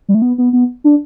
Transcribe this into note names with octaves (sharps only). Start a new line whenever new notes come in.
G3
A3
B3
B3
B3
D4